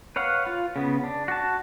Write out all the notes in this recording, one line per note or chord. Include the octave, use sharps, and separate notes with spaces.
B4 C#5 F5 F#5
F4
C#3 B3
D4
F#4 A5